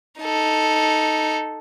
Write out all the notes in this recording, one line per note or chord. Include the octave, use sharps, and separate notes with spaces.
D#4 A4